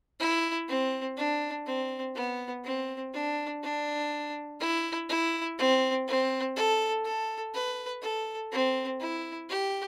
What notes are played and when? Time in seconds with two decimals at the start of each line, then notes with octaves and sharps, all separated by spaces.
0.20 E4
0.68 C4
1.17 D4
1.67 C4
2.15 B3
2.65 C4
3.14 D4
3.63 D4
4.60 E4
5.09 E4
5.59 C4
6.08 C4
6.56 A4
7.05 A4
7.54 B4
8.02 A4
8.52 C4
9.00 E4
9.49 G4